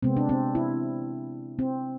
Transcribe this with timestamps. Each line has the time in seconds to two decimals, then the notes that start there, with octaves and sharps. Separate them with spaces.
0.03 C3 G#3 B3 C4
0.17 D4
0.29 C4
0.55 E4
1.59 C4